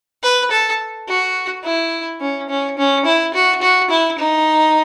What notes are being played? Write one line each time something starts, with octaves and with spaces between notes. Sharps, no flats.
B4
A4
F#4
E4
C#4
C#4
C#4
E4
F#4
F#4
E4
D#4